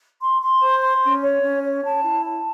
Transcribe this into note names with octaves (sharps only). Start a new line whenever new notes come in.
C6
C6
C5
C6
C#4
C#5
C#4
C#5
A5
E4
A5